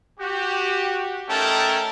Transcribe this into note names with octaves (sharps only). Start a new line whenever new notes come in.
F#4 G4
A3 C#4 D#4 A#4 G5 A5